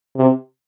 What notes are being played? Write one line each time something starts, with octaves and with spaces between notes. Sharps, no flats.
C3